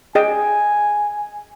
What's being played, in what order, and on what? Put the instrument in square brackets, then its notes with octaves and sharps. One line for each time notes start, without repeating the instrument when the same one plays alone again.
[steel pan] G#4 D#5 G5 [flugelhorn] G#5